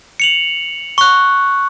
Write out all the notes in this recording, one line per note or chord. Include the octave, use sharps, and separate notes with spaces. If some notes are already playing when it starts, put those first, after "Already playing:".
C#7 F7 F#7
C#6 F#6